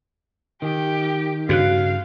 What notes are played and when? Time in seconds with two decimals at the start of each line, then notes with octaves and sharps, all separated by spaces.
0.62 D#3 G4
1.49 G2 C#3 F#4 F5 F#6